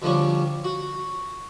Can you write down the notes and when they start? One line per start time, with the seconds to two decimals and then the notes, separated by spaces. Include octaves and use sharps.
0.02 D2 D3 F3 G3 C#4
0.64 F#4